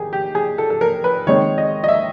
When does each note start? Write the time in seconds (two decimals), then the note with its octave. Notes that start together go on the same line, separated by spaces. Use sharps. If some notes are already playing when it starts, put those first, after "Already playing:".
Already playing: D#3 G4 G#4
0.13 G4
0.35 G#4
0.58 A4
0.70 A4
0.81 A#4
1.04 B4
1.27 D#3 G#3 C4 C#5
1.58 D#5
1.84 D#5
1.88 E5